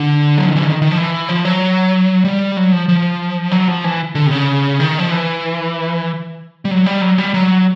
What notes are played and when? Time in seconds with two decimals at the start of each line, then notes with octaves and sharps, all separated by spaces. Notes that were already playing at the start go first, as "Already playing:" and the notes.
Already playing: D3
0.37 F#3
0.46 F3
0.56 E3
0.66 D#3
0.82 D#3
0.91 F3
0.97 E3
1.29 F3
1.45 F#3
2.25 G3
2.57 F#3
2.72 F3
2.89 F3
3.52 F#3
3.68 F3
3.84 E3
4.15 D3
4.27 C3
4.31 C#3
4.80 D#3
4.99 F3
5.11 E3
6.65 G3
6.71 F#3
6.86 G3
7.01 F#3
7.18 G3
7.34 F#3